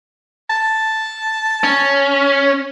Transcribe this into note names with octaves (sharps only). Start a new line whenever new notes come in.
A5
C#4